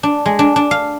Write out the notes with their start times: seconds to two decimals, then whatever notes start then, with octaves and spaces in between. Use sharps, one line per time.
0.03 D4
0.26 G#3
0.39 D4
0.56 D4
0.71 F5